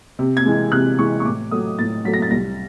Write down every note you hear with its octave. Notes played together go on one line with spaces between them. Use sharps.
C3
G#6
E3 G#3
C3 F#6
E3 G#3 C#6
C#6
A2 D6
F#3 A3 D#6
A2 A6
F#3 A3 B6
A#6
A6
C2 A#6